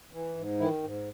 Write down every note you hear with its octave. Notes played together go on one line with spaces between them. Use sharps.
E3
G#2
D#3 E3 E4
G#2